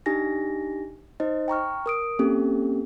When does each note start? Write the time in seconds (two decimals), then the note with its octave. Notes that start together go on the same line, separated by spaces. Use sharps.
0.06 D4 D#4 G4 G#5 A#6
1.20 D#4 C5 D#5
1.48 G5 A#5 C#6 F6
1.86 A#4 D#6 D7
2.19 A#3 C4 C#4 G4 A4